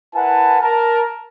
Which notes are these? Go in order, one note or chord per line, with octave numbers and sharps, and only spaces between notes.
E4 A#4 B4 F#5 G#5 A5
A#4 A5